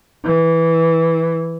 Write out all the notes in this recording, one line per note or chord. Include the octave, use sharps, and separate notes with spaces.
E3